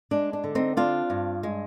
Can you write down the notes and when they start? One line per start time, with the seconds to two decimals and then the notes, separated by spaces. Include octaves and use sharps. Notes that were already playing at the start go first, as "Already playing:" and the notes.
0.11 G#3 D4
0.33 D4
0.44 D3
0.55 C4 D#4
0.76 C4 D4 F4
1.10 G2
1.43 G#3